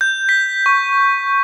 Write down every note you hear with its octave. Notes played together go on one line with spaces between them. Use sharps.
G6
B6
C#6